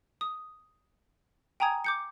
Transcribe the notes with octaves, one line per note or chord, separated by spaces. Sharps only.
D#6
G5 G#5 A#5 D#6 G#6
D6 G6 C#7